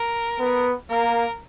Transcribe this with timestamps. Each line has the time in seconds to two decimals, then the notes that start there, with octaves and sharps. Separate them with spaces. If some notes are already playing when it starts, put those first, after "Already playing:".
Already playing: A#4
0.39 B3
0.90 A#3 A#4